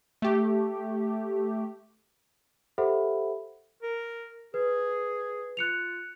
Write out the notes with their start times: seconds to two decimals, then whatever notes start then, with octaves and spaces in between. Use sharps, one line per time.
0.22 A3 G4
2.78 G4 A4 C5 E5 F#5 B5
3.83 A#4
4.54 G#4 B4
5.57 F4 F#6 C#7 F7